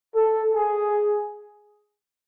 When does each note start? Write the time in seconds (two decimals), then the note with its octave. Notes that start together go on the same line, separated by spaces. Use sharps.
0.15 A4
0.54 G#4